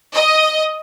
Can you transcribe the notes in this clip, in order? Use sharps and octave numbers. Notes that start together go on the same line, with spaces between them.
D#5